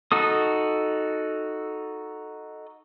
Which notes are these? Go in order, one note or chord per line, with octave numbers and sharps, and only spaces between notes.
D#4 F#4 A4 D#6